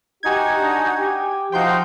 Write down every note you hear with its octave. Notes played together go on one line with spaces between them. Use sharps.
D#4 F#4 G4 G#5 G#6
D4
G4
F3 D#4 F#4 F5 G5 C6 G6